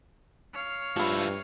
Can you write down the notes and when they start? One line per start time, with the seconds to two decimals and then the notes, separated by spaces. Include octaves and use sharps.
0.53 C#5 F5
0.96 G2 F3 E4 F4 B5